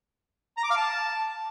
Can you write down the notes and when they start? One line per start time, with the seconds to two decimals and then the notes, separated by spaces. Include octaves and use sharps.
0.58 A#5
0.64 D6
0.70 F5
0.77 A5